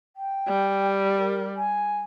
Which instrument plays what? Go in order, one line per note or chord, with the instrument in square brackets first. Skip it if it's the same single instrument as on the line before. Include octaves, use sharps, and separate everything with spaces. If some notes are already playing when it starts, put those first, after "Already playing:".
[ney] G5
[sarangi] G3
[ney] A#4
G#5